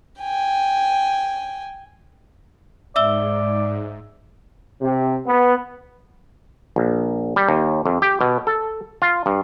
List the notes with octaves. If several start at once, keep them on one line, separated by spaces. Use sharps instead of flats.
G5 G#5
G#2 D5 E5 E6 G7
C3
B3
A#1
G3
D#2
F2
G4
B2
A4
F4
G2